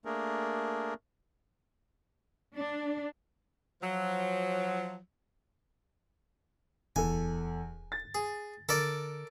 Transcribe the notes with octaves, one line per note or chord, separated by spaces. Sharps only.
A3 A#3 D4 G#4 A#4
D4
F3 F#3
D1 E2 A4 G#5
A6
G#4
D3 A4 A#4 D5